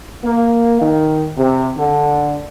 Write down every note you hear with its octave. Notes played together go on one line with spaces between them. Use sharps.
A#3
D#3
C3
D3